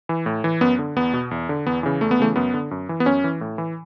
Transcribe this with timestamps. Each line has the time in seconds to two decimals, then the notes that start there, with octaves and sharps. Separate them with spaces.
0.09 E3
0.26 A2
0.44 E3
0.61 F#2 B3
0.79 D3
0.96 E2 B3
1.14 B2
1.31 E2
1.49 D3
1.67 E2 B3
1.83 C#3 E3
2.01 E2 A3
2.11 B3
2.19 C#3 E3 A3
2.36 F#2 B3
2.54 D3
2.71 F#2
2.89 E3
3.00 B3
3.06 F#2 C#4
3.24 E3
3.41 A2
3.58 E3